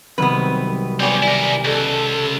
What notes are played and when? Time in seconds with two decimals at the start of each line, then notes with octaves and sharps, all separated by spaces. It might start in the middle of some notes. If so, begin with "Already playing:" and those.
0.18 C2 D#3 F#3 B3 C4 B4
1.00 G3 B3 C4 G4 C#5 D5 G#5 D6
1.23 E4 A#4
1.65 C#2 A4